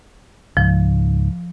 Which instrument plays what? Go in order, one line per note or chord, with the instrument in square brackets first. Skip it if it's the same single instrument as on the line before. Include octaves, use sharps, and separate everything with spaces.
[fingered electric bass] C#2 G#2 [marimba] F3